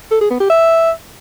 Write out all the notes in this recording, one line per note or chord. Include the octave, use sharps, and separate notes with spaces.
A4
G#4
B3
G4
E5